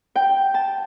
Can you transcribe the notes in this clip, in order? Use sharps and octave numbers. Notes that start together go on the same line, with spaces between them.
G5
A5